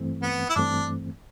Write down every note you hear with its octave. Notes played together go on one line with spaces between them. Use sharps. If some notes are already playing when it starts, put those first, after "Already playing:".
Already playing: G2 E3 A3 C4
B3
E4
G2 E3 A3 C4 D4